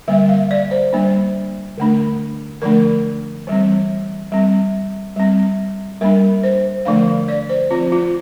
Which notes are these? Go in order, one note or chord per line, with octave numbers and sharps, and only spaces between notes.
D3 G3 A#3 E5
F5
D5
C5
G3 A#3 D4
D3 A3 D4
D3 F3 A3 D4 A#4
E3 G3 C4
G3 C4
G3 C4
G3 A#3 D4 A#4
C5
D3 F3 A3 D4 F5
D5
C5
F3 C4 F4
F4